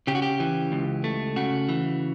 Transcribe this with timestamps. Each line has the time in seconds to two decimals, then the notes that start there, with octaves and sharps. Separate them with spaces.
0.07 C#3 G4
0.15 F#4
0.22 G4
0.40 E3
0.72 C#2
1.04 A3
1.36 C#3 F#4
1.69 E3